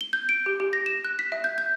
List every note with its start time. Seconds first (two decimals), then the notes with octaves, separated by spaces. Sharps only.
0.01 G7
0.13 G6
0.29 D7
0.46 G4
0.60 G4
0.73 A#6
0.86 E7
1.05 F#6
1.19 B6
1.32 E5
1.44 G6
1.58 G6